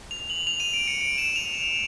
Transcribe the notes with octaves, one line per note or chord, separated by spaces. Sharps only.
F7
F#7
F7
D#7
D7
C#7
D7
E7
F7
F7